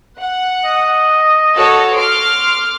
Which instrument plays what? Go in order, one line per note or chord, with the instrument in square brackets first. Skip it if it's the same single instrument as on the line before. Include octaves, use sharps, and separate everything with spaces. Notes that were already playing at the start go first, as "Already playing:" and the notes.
[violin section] F#5
[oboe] D#5
[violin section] F#4 A4 C#5
C6 D6 F6